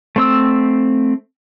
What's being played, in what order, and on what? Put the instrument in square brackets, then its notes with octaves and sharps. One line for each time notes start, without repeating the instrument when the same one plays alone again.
[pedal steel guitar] A3 C4 E6